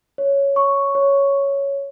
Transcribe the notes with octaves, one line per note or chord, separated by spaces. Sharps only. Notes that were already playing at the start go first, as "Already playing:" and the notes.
C#5
C#6
C#5